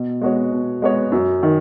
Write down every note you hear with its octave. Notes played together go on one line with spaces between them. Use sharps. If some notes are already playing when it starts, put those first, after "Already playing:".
Already playing: B2
G#3 B3 F#4 C#5
B2
G#3 B3 F#4 C#5
F#2
D#3